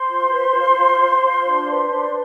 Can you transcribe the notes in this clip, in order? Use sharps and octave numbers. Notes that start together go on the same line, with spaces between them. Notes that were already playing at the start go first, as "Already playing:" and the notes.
Already playing: C5 C6
F4
B4
F4
F4
F4
F4
D4
B4
D4